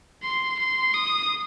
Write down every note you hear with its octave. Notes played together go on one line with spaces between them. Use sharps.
C6
C6
D#6